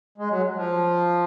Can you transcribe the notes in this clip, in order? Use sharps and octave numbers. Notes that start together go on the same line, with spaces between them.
G#3
F#3
F3